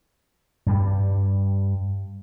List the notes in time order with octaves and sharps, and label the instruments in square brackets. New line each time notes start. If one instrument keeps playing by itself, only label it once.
[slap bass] G2 G3